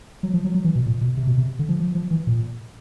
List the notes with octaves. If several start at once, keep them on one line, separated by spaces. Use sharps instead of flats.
F#3
F3
F#3
F#3
E3
B2
A#2
B2
C3
B2
C3
D3
F3
F3
F3
E3
A#2